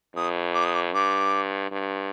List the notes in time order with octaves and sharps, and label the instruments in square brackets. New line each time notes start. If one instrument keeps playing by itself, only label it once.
[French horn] F2 [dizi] D#6
[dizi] D6
D#6
D6
[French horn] G2 [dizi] D6
[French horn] G2